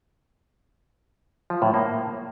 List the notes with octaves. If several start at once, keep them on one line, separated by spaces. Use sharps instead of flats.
F3
A2
A#3